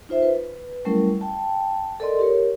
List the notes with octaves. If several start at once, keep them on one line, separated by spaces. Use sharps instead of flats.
D#4 F4 C5 E5
B4
F#3 G3 A3 C#4 E4 A#4
G5 A5
A4 A#4 D5 D#5 C6
G4 A#4 C#5